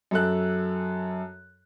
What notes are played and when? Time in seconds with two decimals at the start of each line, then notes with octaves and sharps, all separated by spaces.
0.11 F#2 A4 F#6